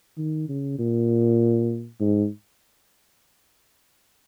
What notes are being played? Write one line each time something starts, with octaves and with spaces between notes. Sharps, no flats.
D#3
C#3
A#2
G#2